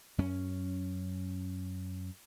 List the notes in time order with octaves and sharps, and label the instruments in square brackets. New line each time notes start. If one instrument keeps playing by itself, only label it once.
[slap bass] F#2 C#4